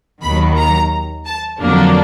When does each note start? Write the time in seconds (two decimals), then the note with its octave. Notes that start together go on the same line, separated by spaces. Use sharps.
0.23 D#2 D#3 F#3 B5
0.57 A#5
1.26 A5
1.60 F2 D3 F#3 A#3 D4